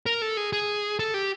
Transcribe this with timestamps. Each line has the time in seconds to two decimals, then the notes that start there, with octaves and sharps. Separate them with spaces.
0.06 A#4
0.22 A4
0.37 G#4
0.53 G#4
0.99 A4
1.14 G4